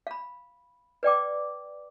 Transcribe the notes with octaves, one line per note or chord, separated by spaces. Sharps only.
F5 B5
B4 D5 G5 D6